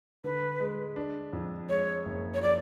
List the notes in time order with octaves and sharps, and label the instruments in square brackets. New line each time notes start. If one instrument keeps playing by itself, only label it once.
[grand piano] D3 [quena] B4
[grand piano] G#3
D4
F2
[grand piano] G#3 [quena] C#5
[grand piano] F#1
[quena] C#5
[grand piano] F3 [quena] D5